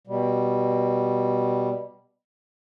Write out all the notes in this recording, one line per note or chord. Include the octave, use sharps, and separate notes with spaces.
B2 G3